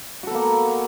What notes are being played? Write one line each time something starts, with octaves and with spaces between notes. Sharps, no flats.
A#3 B3 F#4 A4